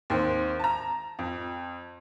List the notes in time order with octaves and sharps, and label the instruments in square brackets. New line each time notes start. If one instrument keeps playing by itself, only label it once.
[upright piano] D#2 D#3 C4
A5 A#5
F2